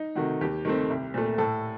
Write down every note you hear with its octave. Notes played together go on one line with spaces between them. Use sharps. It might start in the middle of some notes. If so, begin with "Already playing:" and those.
Already playing: D#4
C3 D#3 A3 F#4
D#2 G4
D#3 A3 C4
C2
A#2 A3
A2 A4